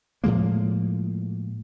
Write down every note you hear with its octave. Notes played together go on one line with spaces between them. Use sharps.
A2 F3 G#3 A#3